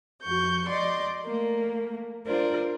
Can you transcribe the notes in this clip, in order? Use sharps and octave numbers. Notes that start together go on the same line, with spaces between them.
F2 F#4 C#6 G6
D5 D#5 C6 D6
A3 A#3
D4 F4 A#4 C5 D5